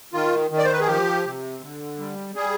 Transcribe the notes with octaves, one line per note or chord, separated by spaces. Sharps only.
D#3 F4
D#3
D5
C5
B4
G#4
F3 G4
C3
D3
G3
G3 G#4